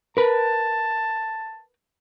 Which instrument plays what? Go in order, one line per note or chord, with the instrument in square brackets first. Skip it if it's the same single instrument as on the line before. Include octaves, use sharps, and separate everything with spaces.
[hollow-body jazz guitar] A#4 B4 [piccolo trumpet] A5